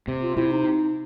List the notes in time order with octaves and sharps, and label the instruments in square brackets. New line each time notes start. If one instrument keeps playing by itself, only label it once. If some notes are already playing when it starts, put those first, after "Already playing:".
[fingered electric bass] C3
[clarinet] F4
[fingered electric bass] C3 [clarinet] E4
[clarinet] D#4